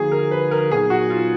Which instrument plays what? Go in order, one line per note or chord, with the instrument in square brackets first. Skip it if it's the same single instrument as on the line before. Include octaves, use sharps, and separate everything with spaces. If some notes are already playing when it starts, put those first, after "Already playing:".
Already playing: [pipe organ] D3 F3 A#3 D#4 F#4 [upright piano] G#4
[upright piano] A#4
B4
A#4
[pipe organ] A#2 F#3 B3 D#4 [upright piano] G#4
[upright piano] F#4
F4